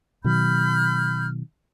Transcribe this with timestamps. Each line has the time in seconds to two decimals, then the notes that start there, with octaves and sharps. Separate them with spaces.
0.24 B2 D#3 F#3 B5 F6 G6